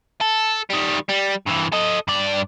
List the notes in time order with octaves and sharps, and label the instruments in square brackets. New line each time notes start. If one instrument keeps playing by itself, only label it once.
[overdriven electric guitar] A4
D#3 G3
G3
G2 E3
A4 D#5
G2 D5